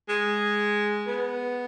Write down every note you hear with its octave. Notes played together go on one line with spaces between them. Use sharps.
G#3
B3